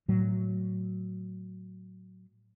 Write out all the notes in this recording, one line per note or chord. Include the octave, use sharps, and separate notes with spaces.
A2 F#3